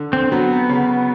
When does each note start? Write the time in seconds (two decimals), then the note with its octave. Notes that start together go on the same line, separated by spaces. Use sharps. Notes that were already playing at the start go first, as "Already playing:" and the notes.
Already playing: D3
0.13 C4
0.32 F#3 B3
0.69 C#3